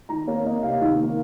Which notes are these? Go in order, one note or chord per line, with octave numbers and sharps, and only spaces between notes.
D#3 A#5
A#3 C#5
A#3 D#5
C3 F5
D#3
A#3